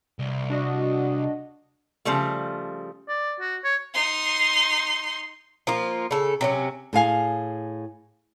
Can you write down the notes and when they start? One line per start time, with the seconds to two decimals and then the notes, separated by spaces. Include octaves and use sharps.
0.19 C2
0.50 D4 F#4 D#5
2.05 C#3 F3 G3 A3
3.09 D5
3.40 F#4
3.64 C#5
3.94 D#4 C6
5.67 F3 A#3 F4
6.11 C#3 A4
6.41 C3 F#3 C#4
6.93 A2 G#4 F5 G#5